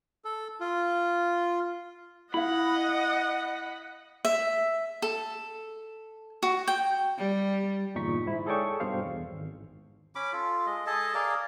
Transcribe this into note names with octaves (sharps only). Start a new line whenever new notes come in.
A4
F4
E4 D#5 F5 F#5 B5
E5
A4
F#4
G5
G3
G1 E2 A#2 D#4 C#6 B6
G#2 E4
G#4 A4 C#5 D5 G5 C#6
G2 B2 C5 F5
E2
G#1
C#4 B5 D6
F4 A4
G#3 D#5
G#4 A4 D#5 A5
G#4 A#4 D5 F5